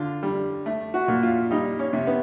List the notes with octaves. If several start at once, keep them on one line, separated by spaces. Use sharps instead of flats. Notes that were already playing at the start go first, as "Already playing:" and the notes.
Already playing: D3 F4
G3
A3
F#4
A#2
F4
G3 D#4
C#4
C3
B3